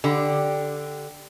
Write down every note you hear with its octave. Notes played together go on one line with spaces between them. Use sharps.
D3 G4